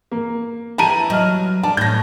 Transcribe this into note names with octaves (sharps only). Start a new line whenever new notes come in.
A#3
E4 G4 B4 A5 A#5 D#7
F#3 D#5 F6
D4 A5
A2 C#4 G6 A#6